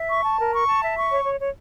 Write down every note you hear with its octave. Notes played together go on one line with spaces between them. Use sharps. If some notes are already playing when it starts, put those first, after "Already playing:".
Already playing: E5
C#6
A5
A#4
C#6
A5
E5
C#6
C#5
C#5
C#5